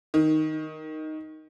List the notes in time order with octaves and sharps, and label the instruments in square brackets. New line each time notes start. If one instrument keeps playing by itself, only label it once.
[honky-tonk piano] D#3